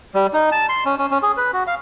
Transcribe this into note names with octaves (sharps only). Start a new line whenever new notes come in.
G3
D#4
A5
C6
C#4
C#4
C#4
G#4
B4
F#4
F5